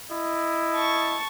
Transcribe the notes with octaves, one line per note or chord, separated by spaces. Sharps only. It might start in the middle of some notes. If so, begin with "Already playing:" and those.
E4 D#5
A5 C#6